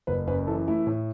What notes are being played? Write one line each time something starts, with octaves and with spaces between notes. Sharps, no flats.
F#1 B4
F#2 B4
E3 A4
A3 E4
A2